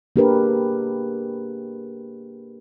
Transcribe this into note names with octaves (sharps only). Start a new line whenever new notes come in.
A#3 D4 G4 G#4 A#4 B4